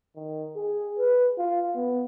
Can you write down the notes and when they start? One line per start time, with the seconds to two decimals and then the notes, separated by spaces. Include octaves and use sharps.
0.16 D#3
0.56 G#4
0.99 B4
1.38 F4
1.76 B3